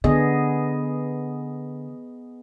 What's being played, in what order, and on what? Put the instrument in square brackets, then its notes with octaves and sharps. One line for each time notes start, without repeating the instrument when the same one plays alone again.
[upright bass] D3 [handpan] B3 G#4 D#5